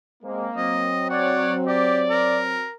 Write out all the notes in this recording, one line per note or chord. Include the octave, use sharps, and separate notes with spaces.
G#3 A#3 C4
F#3 C4 D#5
C#5 D5 F#5
G4 D5
A#4